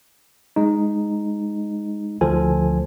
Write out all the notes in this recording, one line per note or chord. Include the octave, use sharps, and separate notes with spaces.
G#3 D#4
D2 F3 A4 G#5